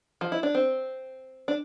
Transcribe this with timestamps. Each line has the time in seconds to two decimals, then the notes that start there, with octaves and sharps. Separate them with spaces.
0.21 F3
0.32 E4
0.43 D4
0.55 C4
1.48 D4